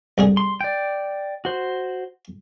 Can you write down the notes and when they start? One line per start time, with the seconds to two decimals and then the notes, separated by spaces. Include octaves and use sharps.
0.18 C2 D3 G#4
0.37 C6
0.61 D5 G5
1.45 F#4 C5